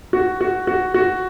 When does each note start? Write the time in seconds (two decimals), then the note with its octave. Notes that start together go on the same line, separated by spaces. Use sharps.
0.13 F#4
0.41 F#4
0.67 F#4
0.94 F#4